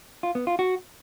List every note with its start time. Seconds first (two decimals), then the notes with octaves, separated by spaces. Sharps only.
0.23 F4
0.35 B3
0.47 F4
0.59 F#4